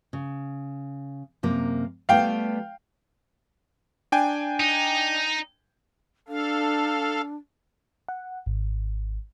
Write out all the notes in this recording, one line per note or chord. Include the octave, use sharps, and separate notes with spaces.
C#3
F#2 C3 A#3
G3 A3 B3 F5 G5
D4 G5 G#5
D#4
D4 A4 F5
F#5
G#1